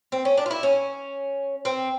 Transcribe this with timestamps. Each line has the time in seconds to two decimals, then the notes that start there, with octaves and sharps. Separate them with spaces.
0.12 C4
0.25 C#4
0.38 D4
0.46 F4
0.51 E4
0.63 C#4
1.65 C4